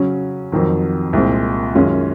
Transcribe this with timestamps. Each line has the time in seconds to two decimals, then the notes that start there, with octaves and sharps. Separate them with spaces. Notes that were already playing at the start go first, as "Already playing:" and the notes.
Already playing: C#3 F#3 C#4
0.52 F2 D#3 F#3
1.13 C2 A#2 G#3 C4
1.75 F#2 D#3 G#3 C#4 F4